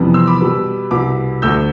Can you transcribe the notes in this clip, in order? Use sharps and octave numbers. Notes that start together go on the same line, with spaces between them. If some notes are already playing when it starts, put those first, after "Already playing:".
Already playing: F2 C3 E3 G3 B3
C6 E6
B5 D6
B2 G3 B3
C2 B2 B3 B5 D6
D2 D3 A3 E6 G6